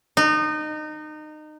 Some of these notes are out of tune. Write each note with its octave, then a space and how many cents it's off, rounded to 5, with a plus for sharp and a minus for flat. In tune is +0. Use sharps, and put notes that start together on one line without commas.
D#4 -25